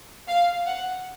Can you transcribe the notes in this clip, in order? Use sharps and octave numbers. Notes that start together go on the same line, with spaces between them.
F5
F#5